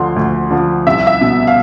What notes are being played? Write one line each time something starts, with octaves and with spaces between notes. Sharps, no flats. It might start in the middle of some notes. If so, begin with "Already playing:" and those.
Already playing: D2 D3 F3 C6
D2
D3 F3
C2 E5
E5
B2
F5